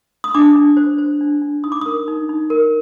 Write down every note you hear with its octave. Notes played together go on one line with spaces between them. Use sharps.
D#6
D4 D6
D4
C5
C5
D4
D4
D#4 D#6
D6
A#4 D#6
D#4
D#4
A#4